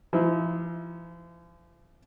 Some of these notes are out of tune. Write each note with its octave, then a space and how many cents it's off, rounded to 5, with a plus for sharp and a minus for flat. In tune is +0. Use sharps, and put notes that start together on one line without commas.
F3 -45 E4 -35